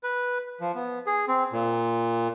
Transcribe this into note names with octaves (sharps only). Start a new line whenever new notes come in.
B4
F3
B3
G#4
C4
A#2